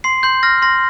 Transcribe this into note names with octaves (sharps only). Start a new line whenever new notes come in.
C6 C7
C6 G6
F6 A#6
C6 A#6